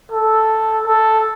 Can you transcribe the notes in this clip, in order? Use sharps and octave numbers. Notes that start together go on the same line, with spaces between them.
A4
A4